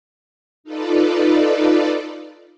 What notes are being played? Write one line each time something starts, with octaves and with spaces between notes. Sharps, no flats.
D#4 F4 A4 B4 D5